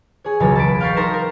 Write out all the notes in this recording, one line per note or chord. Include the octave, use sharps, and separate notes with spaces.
G#4 C#5
E1 C#2 F#3 C#5 A6
A5 B5 D7
F5 G5 C#6 A6 B6 C7
D#4 A#4 A#5 C6 A6 E7
A#4